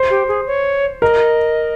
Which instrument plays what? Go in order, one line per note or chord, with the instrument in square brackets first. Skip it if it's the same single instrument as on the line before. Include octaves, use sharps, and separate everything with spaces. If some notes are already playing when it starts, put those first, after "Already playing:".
Already playing: [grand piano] C5
[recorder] G4
G#4
C#5
[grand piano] A#4 [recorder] D#5